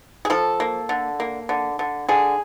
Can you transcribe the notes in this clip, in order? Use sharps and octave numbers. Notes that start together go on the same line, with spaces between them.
G#4
F3 A4
A#3
D3
A#3
D3
D3
D3 G#4